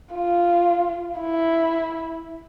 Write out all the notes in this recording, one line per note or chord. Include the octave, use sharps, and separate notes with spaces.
F4
E4